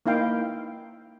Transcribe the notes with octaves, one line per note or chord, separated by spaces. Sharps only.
A#3 D#4 E4 F5 G5